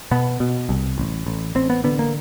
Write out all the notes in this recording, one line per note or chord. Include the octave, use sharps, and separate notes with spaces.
B2 B3
B2
C2
A1
A1
A1 C4
B3
D3 B3
A#3